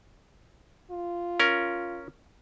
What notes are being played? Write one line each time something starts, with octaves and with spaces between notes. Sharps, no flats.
F4
C#4 A#4